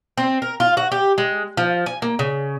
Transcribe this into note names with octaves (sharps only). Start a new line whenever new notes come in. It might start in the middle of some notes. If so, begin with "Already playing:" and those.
C4
A#4
F4
F#4
G4
G#3
F3
G#5
A#3
C#3